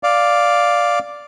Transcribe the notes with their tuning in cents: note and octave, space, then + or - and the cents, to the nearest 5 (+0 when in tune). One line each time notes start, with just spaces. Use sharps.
D5 +0 F5 +0